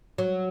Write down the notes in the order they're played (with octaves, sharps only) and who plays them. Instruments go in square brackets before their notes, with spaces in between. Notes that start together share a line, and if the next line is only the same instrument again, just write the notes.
[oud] F#3